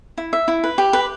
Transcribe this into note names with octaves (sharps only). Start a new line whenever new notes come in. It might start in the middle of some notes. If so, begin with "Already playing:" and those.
E4
E5
E4
B4
G4
B4